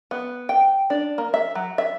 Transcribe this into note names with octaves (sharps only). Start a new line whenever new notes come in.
B3
G5
D4
A#3
E5
F#3
E5